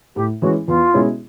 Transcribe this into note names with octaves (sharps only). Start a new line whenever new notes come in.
A2 G4
E3 G#3 C#4 F#4
E2 F4
B2 G#3 C#4 E4